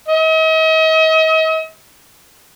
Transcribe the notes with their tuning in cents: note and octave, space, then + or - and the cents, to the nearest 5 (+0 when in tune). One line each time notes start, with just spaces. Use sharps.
D#5 +40